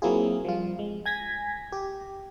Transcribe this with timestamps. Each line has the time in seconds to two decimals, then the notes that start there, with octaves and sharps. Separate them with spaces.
0.02 F#3 A#3 C4 E4 F4 G#4
0.45 F3 G3 F4
0.79 G#3
1.05 G#5 G#6 A#6 B6
1.72 G4